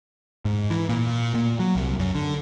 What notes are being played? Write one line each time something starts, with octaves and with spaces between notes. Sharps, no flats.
G#2
E3
A#2
A#2
F#3
C2
F#2
D3